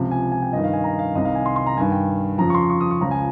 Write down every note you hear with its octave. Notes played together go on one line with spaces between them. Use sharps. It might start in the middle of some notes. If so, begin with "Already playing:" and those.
Already playing: C#2 C3 F3
G#5
G#5
G5
G2 D#3 D#5
F5
G#5
A#5
F5
C2 C3 D#3 D#5
F5
G#5
C6
C6
A#5
G2 D#3 G#5
G5
F2 C#3 F3 A#5
C#6
C6
C#6
D#6
C#6
C#2 C#3 F3 A#5
G#5